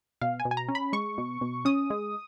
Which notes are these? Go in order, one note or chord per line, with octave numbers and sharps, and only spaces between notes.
B2 F5
G#5
B2
G#5
A#5
C#4
B5
G#3 C#6
B2
B2
C#4 D#6
G#3